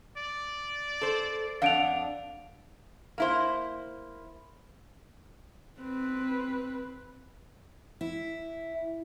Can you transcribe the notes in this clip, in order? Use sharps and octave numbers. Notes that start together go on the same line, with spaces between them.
D5
A4 C5
F2 D4 F5 F#5 D7 F7
A#3 E4 C5
C4 B4
E4